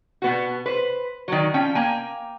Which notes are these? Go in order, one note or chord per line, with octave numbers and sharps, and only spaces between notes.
B2 B3 F#4
B4 C5
D#3 F#3
F3 C#4 G5
A#3 G5 G#5 A#5